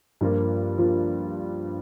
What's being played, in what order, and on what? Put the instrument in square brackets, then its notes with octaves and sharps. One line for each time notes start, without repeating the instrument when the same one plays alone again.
[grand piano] G2 F3 A#3 F4
F3 A#3 F4